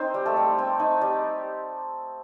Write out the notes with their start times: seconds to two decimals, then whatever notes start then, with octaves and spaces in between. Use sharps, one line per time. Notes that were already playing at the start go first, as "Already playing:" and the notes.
Already playing: C4 D#4 C5
0.14 G3
0.25 A3 A4
0.37 G3
0.58 C4
0.79 D#4
1.01 G3